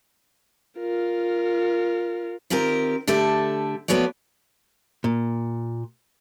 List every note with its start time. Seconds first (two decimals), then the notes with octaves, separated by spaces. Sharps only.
0.80 F4 A#4
2.50 D#3 C4 F4 G4 A#4
3.07 D3 A3 G4 A4 E5
3.88 F3 A3 B3 F#4 C#5 D5
5.04 A#2